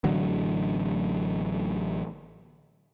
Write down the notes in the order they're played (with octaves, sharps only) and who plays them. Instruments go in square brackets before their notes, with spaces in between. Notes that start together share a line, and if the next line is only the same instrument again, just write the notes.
[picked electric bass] A1 D3 F#3